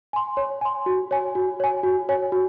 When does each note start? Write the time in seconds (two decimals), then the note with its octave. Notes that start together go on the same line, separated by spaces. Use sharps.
0.13 G#5 C6
0.37 C#5
0.61 G#5 C6
0.86 F#4
1.11 C#5 G#5
1.35 F#4
1.60 C#5 G#5
1.83 F#4
2.09 C#5 G#5
2.32 F#4